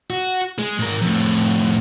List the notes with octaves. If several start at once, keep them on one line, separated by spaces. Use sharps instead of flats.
F#4
G#3
G#2 A#4
F2 A2